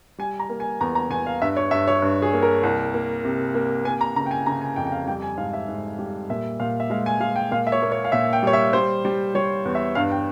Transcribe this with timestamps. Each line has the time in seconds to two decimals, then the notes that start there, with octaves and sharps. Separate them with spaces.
0.18 G3 G#5
0.39 A#5
0.49 A#3
0.60 G#5
0.81 E2 A#5
0.95 A#5
1.10 E2 G#5
1.26 F5
1.42 G2 E5
1.57 C#5
1.71 G2 E5
1.88 C#5
2.02 G2
2.22 G#4
2.33 A#3
2.42 A#4
2.63 C2
2.94 A#3
3.24 C3
3.55 A#3
3.85 A#3 G#5
4.01 A#5
4.16 C#3 A#5
4.26 G5
4.31 G#5
4.46 C#3 A#5
4.61 G#5
4.76 F2 G5
4.87 G5
4.92 F5
5.07 G3 G5
5.22 G#5
5.37 G#2 F5
5.53 E5
5.68 G#2
5.99 G3
6.30 A#2 E5
6.60 A#2 F5
6.80 E5
6.90 G#3 F5
7.06 G#5
7.20 G#3 F5
7.36 G5
7.51 A#2 F5
7.67 E5
7.72 C#5
7.82 A#3
7.92 C#5
8.04 F5
8.12 A#2 E5
8.33 G5
8.43 G3 C#5
8.53 E5
8.73 G3 C5
9.05 G3
9.35 G3 C#5
9.65 E2
9.75 E5
9.95 G2 F5
10.11 G5